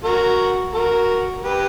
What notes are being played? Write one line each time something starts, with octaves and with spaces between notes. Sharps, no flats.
F#4 A#4
F#4 A#4
G4 B4